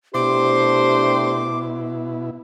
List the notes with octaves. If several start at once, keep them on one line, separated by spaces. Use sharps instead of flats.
B2 A3 D4 E4 G4 C5 D6